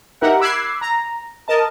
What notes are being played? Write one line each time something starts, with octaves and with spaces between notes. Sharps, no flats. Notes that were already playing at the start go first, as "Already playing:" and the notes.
D#4 G4 A#4 E5 F#5
B5 D6 E6 F#6 G#6 C7
A#5
A#4 D#5 A5